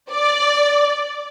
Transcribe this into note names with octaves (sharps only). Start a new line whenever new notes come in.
D5